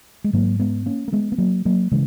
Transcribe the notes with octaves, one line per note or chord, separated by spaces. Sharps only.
G#3
G#2 F#3 A#3
G#3 B3
A#3 C#4
A#3
G#3 B3
B3
F#3 A#3
F#3 A#3
C#3 E3 G#3